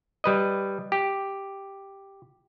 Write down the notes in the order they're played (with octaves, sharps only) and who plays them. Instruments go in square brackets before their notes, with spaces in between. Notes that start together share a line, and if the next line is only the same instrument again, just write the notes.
[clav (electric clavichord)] G3 B4 D#5
G4